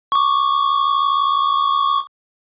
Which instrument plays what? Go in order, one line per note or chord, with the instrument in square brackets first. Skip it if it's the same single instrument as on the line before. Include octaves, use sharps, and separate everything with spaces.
[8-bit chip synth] C#6 D6